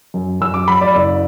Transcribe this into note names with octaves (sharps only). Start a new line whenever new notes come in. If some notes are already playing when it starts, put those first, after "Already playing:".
F#2
F#2 E6
D6
F#3 B5
D5
F#1 D5